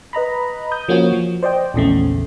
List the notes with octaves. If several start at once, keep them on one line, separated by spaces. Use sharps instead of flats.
B4 D#5 A#5 B5
D#6 G6
F3 A#3 C#4 F#4 C#5
F3
C5 D5 D#5 G5
A#1 E2 C#3 A3